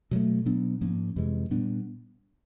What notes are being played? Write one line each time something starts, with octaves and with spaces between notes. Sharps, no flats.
B2 F#3 A3
B2 F#3 B3 D4
G#2 F3 A#3 C#4
F2 C3 E3 G#3
A#2 G3 B3 D4